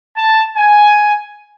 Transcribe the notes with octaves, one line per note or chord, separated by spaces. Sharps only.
A5
G#5